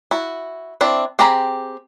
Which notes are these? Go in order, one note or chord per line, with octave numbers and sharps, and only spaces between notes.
E4 F#4
C4 D4 E4 E5
C4 G4 G#4 A#5 B5